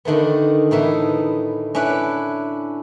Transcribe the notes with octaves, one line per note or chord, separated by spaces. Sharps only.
D3 D#3 A3 B3
A2 E3 B3 D#4 E5
C#4 D4 E4 B4